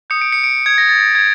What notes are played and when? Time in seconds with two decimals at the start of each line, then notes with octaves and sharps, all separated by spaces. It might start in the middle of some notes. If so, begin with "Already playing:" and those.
0.10 D#6 G6 C#7
0.21 D7
0.32 C#7
0.44 D7
0.66 G#6
0.78 A#6
0.89 A6
1.00 A6
1.15 G#6